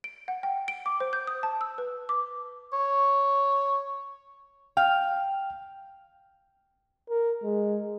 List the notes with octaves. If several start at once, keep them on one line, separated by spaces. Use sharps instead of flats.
D7
F#5
G5
D7
D6
C5
G6
D#6
A5
E6
B4
D6
C#5
F5 G5
A#4
G#3